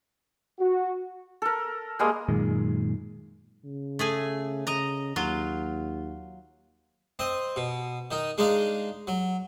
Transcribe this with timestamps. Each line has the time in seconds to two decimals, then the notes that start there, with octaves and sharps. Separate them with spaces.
0.59 F#4
1.42 A4 A#4
1.99 G3 G#3 A#3 D#6
2.29 F#2 A#2 D#3 G#3
3.65 C#3
3.99 A3 G#4 G#5
4.67 C#3 D#5 A#5
5.16 D#2 F#3 F4
7.19 C4 D#5
7.56 B2
8.11 D#3 D#4
8.38 G#3 D4 D#4 F5
9.07 F#3